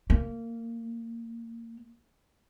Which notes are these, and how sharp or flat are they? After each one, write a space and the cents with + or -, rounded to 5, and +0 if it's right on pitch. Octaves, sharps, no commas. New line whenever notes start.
A#3 -20